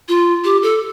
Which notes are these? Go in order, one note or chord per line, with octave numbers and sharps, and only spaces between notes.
F4
G4
A4